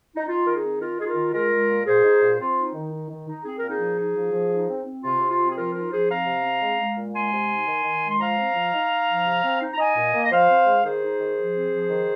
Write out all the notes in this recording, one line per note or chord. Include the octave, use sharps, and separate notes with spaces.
D#4
D#4 F4
D#3 A#4
D#4 G#4
C4
D#3 F4 A#4
D#4 G#4
F4 A#4
D#3
G#3 F4 A#4
G#3
A#2
A#2 G#4 C5
D#4
A#2
C4 F4
D#4
D#3
D#4
D#3
D#4
C4 G#4
A#4
A#2
D#4 G#4
F3
D#4
F3
F3
D#4
C4
C4
C3 F4
C3
F4
C4
G#4
F3 F4 A#4
D#4 F4 A#4
F3 G#4 C5
C4 F5 A#5
C3
C4
G#3
G#3
A#2
G#3 G#5 C6
C3
D#4
D#3
D#3
G#3
C6
F3 F5 A#5
C4
F3
D#4
D#4
F3
C3
C4
D#4
A#5
D#4 D#5 G#5
A#2
A#3
D#5
F3 C5 F5
C4
G#3
D#3 G#4 C5
D#4
D#3
F3
C4
F3
D#3